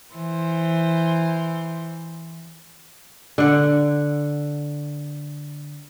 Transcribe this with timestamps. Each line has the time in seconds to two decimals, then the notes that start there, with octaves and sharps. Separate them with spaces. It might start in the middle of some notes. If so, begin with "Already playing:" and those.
0.15 E3 C5
3.38 D3 F#5